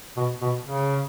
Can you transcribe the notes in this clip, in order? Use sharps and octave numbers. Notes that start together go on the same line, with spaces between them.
B2
B2
C#3